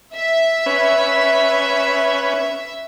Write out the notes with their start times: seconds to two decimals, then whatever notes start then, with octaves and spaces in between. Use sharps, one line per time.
0.15 E5
0.66 C#4 B4